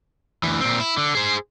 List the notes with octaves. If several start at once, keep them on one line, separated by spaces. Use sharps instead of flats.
D2 E3
A#2 C4
E4
D3
G#4 C5